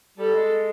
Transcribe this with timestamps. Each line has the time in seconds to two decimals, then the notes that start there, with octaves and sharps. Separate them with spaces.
0.18 G3 A4
0.34 G#3